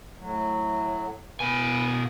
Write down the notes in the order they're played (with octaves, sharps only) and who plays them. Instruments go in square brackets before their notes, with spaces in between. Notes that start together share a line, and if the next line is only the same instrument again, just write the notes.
[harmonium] A2 F#3
[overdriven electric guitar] B2 G#5 [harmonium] B4